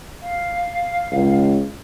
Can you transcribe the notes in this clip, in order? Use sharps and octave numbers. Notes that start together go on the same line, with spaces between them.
F5
C#2